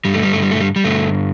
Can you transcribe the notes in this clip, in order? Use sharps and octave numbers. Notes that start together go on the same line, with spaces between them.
G2 D3 G3
A3
G3
A3
G3
A3
G3
G3
G2 D3 A3